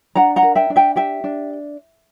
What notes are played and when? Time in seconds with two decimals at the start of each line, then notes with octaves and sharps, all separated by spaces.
0.15 D4 F#5 A#5
0.36 F#5 A#5
0.42 A#4
0.55 E5 G5
0.70 D4
0.76 E5 G5
0.96 G4 E5 G5
1.24 D4